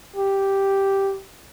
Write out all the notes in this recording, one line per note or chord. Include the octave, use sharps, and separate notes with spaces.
G4